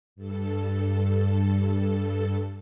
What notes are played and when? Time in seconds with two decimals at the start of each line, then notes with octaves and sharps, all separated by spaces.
0.16 G2 A4